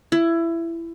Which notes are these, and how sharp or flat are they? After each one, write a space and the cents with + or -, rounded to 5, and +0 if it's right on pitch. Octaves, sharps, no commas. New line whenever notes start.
E4 +20